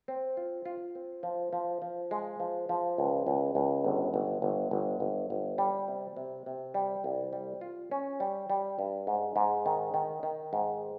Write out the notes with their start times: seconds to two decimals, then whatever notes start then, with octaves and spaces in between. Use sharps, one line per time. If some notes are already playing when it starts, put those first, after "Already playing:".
0.08 C4
0.37 F4
0.65 F4
0.95 C4
1.23 F3
1.53 F3
1.82 F3
2.11 G#3
2.40 F3
2.69 F3
2.98 C#2
3.27 C#2
3.55 C#2
3.84 G1
4.14 G1
4.42 G1
4.71 G1
5.00 G1
5.30 G1
5.58 G3
5.88 C3
6.17 C3
6.46 C3
6.74 G3
7.04 C2
7.33 G3
7.61 F4
7.91 C#4
8.20 G3
8.50 G3
8.79 G2
9.07 G#2
9.36 G#2
9.66 D#3
9.94 D#3
10.23 D#3
10.53 G#2